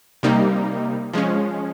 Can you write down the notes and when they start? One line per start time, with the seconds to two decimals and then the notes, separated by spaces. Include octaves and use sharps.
0.23 C3 G3 A#3 D#4
1.13 F3 G#3 C#4